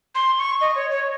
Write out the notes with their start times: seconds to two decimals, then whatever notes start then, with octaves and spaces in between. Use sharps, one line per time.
0.15 C6
0.38 C#6
0.61 D#5
0.76 C#5
0.91 C#5